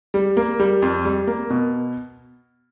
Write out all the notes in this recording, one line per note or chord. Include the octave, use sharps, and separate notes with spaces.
G3
A#3
G3
F2
G3
A#3
B2